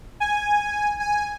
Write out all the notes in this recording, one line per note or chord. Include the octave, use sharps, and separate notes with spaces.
G#5
G#5